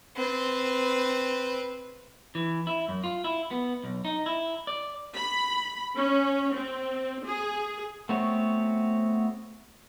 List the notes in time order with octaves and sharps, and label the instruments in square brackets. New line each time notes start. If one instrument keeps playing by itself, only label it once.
[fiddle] C4 B4
[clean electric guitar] E3
E4
F#2
F4
E4
B3
B1
D#4
E4
D5
[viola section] B5
C#4
C4
G#4
[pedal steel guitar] A3 B3 C4 F#4 C#5